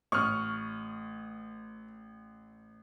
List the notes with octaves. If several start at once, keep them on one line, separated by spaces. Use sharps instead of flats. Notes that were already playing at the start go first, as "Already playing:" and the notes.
A1 C#6 D#6 F6